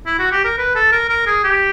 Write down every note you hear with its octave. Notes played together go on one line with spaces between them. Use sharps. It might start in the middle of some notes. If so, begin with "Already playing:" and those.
E4
F#4
G4
A#4
B4
A4
A#4
A#4
G#4
G4